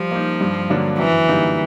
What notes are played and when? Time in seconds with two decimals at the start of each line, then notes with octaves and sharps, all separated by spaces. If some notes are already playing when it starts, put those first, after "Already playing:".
Already playing: F3 G3
0.12 A#3 D#4
0.41 G2
0.70 D3 F#3 A#3 D4
0.99 F#2 E3
1.29 D3 G3 A#3 D#4